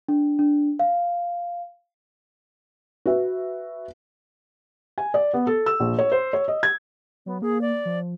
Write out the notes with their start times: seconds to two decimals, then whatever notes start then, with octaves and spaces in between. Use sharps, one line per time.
0.08 D4
0.39 D4
0.79 F5
3.06 F#4 B4 E5
4.98 G#5
5.14 D5
5.34 B3
5.47 A4
5.66 E6
5.80 A#1
5.99 C#5
6.12 C5
6.33 C#5
6.48 D#5
6.63 G#6
7.26 F#3 B3
7.42 A#3 G#4
7.61 D5
7.85 F3